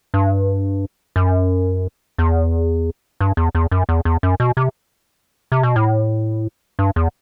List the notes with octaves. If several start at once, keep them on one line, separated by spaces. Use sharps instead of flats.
G2
F#2
E2
G2
E2
E2
F#2
E2
E2
F#2
B2
C3
C3
B2
A2
G2
E2